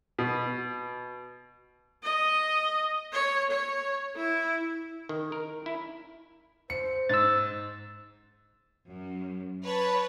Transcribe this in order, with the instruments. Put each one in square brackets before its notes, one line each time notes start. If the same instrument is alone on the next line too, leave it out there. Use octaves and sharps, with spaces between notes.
[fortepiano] B2
[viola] D#5
C#5
C#5
E4
[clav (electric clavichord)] D#3
A#4
E4
[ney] C5 [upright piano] C#7
[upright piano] G#2 [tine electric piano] E6 A6
[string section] F#2
B4 C#5 A5